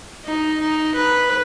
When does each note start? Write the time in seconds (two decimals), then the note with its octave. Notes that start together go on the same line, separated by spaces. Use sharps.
0.25 D#4
0.60 D#4
0.95 B4